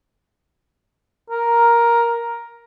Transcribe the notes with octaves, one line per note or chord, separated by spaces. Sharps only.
A#4